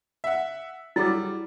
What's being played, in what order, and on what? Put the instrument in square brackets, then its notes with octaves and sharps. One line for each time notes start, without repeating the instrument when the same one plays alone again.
[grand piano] E5 F#5
[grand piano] F#3 G3 [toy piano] E4 G#4